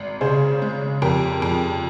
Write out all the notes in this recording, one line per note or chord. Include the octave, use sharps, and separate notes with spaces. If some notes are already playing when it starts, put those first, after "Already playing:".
Already playing: G#1
C#3 G#4 C5
G#3
F2 G4 A#4
F2